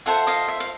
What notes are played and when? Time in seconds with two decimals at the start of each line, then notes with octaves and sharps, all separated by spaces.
0.06 F4 A4 C5 E5 F#5
0.27 D#5 F5
0.48 E5
0.60 F5